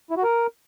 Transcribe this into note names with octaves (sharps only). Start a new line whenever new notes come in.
E4
F#4
A#4